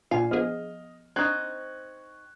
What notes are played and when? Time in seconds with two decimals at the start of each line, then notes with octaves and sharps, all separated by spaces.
0.11 A#2 F4 F5 G#5
0.31 F3 B3 G#4 D#5 F6
1.16 C4 D#4 C#6 F#6 G#6